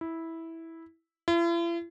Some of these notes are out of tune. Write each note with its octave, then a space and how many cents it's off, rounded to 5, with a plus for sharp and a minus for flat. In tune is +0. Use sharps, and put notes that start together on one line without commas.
E4 -10
E4 +45